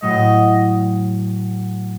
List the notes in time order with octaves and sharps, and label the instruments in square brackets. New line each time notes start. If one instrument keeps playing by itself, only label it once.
[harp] A2 F#3 A3 [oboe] D#5